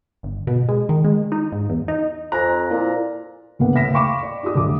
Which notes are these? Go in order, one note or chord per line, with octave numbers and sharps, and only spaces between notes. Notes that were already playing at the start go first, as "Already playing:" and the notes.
G1
B2
G#3
D#3
G#3
D#4
G#2
E2
D#4
F2 C5 G#5 A#5 F#6
A#2 E4
F#1 D2 A#3 B3 F#5
A2 C#3 E5 A#6 B6 E7
F5 G5 B5 C#6 D6 E7
D5
D#4 F#4 G4 D#6
F1 D2 F#3 D6